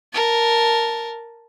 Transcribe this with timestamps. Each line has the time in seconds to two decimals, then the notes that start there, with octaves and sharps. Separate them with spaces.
0.13 A#4 A5